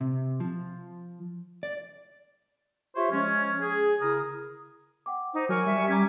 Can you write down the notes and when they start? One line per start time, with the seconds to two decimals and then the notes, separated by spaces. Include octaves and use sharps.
0.01 C3
0.40 F3
1.63 D5
2.96 F4 G4 C5 C#5 E5
3.12 F3 G#3 C#4
3.61 G#4
4.02 C#3 E4 A#4 D#6
5.06 F#5 G5 D6
5.34 D#4 C5
5.49 F#3 A#4 G#5 C#6
5.66 G3 E5
5.88 C#4 G#5 A#5 D6 G#6 B6